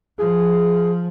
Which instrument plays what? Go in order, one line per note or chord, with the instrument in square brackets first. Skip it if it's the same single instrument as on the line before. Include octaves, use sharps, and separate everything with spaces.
[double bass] F3 [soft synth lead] G#4